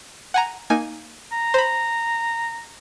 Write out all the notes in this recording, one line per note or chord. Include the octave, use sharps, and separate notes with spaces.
F#5 G#5 A#5
A#3 D#4 G#5
A#5
C5 B5